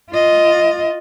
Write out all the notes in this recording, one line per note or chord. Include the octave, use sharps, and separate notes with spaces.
F4 D#5